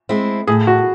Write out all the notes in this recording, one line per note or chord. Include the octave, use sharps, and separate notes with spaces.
G#3 C4 E4
A2 G#4
F#4